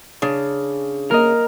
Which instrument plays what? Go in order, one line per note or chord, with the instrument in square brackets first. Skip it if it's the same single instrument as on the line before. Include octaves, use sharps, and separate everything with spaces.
[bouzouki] C#3 [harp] D4
[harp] A#3 D#5 [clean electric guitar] A#4